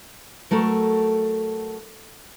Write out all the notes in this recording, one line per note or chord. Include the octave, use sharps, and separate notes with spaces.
F#3 A3 A4 A#4